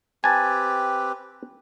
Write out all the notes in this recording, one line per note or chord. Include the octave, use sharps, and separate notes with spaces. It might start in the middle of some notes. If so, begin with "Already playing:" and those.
C4 G4 B4 G#5 A5